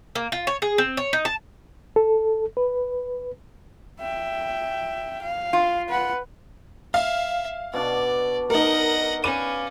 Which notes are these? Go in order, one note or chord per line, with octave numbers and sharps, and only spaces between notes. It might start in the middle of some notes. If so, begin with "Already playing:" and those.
A#3
F4
C#5
G#4
C4
C#5
D#4
A5
A4
B4
E5 G5
F5
F4
B4 F#5
E5 F5
B2 D4 D5
D#4 A#4 D#5 F#5
C#4 B4 D5 F5 D#7